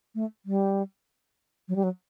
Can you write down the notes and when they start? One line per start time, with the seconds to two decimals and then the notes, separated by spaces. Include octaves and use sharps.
0.15 A3
0.46 G3
1.69 F#3
1.76 G3
1.84 F#3